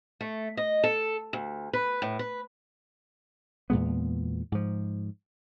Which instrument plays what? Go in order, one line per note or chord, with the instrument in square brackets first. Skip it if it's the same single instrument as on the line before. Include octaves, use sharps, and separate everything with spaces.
[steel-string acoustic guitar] A3
D#5
A4
D2
B4
A2
B4
[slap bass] E2 A#2 G#3 B3
G#2 F3